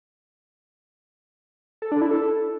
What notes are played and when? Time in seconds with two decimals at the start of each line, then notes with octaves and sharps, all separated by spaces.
1.82 A4
1.92 D4
2.01 E4
2.11 A4